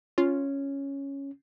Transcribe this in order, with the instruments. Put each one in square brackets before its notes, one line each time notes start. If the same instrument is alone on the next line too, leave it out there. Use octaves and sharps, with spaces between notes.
[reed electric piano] C#4 [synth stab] F4